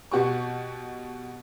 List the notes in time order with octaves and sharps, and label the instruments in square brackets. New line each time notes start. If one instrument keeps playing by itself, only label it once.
[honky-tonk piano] B2 F#4 G4 C#6